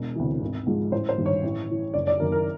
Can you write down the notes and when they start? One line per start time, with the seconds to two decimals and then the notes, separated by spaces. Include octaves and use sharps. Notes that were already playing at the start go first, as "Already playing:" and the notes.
Already playing: E1
0.15 D2 C3 E3
0.41 G#1
0.67 G#2 F3 G#3
0.92 A1 C5
1.09 C5
1.18 G2 D#3
1.26 C#5
1.43 A1
1.68 A2 E3
1.94 F#1 D5
2.07 D5
2.19 F#2 D#3 A#4
2.32 A#4